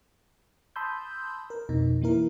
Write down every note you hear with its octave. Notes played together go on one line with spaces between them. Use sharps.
A5 B5 C6 D#6 E6 G6
A#4
F2 B2 D#4
E3 A#3 E4 A#4